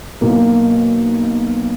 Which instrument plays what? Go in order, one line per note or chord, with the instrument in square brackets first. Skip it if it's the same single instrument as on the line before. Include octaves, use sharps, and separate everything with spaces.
[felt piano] B1 A#3